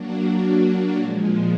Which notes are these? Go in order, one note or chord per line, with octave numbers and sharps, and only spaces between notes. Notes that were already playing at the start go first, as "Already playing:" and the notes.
Already playing: F#3 A#3 D4 F#4
A#2 F3 G#3